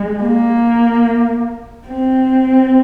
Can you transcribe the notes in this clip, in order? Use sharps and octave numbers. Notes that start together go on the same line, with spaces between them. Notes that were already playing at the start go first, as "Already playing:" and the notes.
Already playing: G#3
A#3
C4